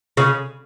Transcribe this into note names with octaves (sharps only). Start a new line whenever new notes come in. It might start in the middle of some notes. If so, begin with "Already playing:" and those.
C#3